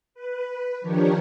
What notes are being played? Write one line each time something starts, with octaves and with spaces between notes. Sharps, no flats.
B4
D#3 F3 D4 G4 A#4 C#5